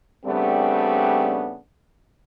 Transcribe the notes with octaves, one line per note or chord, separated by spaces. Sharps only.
C#3 G3 A3 B3 C4 D4